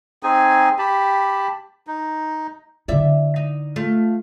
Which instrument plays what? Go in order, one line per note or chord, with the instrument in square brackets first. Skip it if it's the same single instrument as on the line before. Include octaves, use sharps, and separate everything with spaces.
[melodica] C4 D#4 G#4 G#5
G4 A5 B5
D#4
[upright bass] D3 E4 [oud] D5 E5
[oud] D#4
A3 F4